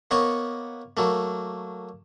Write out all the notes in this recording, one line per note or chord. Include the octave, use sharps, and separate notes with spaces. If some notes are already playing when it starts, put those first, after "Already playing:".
A#3 B3 C#5 D#5 C#6
F#3 A3 A#3